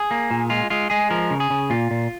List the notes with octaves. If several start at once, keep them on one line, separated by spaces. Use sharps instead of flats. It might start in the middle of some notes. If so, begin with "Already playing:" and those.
Already playing: G#4
A#3
A#2
G#3 F4
G#3 F4
G#3 G#4
F3 A#4
C#3
G#4
C#3
A#2 F4
A#2